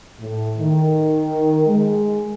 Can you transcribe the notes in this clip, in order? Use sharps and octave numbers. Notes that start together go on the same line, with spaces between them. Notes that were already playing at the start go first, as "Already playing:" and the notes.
A2
D#3
G#3